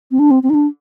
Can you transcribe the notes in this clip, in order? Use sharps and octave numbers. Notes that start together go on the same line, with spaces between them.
C4
D4
C4
C4
D#4
D4